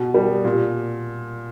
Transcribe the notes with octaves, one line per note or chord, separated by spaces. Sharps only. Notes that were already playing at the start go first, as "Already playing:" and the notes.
Already playing: B2
G3
A#2